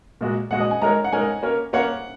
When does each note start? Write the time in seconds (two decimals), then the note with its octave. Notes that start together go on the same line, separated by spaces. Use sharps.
0.21 A#2 G#3 F#4
0.51 A#2 G#3 F#4 F#5
0.60 D#5
0.71 G#5
0.82 G#3 D#4 A#4 C#5 A#5
1.04 F#5
1.12 G#3 D#4 A#4 C#5 G#5
1.43 A#3 C#4 A#4 C#5
1.73 A#3 C#4 A#4 C#5 F#5